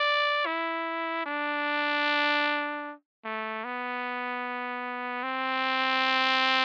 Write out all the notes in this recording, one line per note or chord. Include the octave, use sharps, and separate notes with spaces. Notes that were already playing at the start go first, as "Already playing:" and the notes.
Already playing: D5
E4
D4
A3
B3
C4